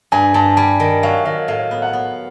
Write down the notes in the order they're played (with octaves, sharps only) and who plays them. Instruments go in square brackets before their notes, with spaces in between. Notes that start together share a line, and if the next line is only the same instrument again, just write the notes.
[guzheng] G2 [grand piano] G#5
[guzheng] G2 [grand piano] A5
[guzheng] G3 [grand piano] G#5
[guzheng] D#3
[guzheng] F#3 [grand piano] F5
[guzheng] D#3 [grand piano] F5
[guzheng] A2 [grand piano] F5
[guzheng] B3
[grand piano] F#5
[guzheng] B3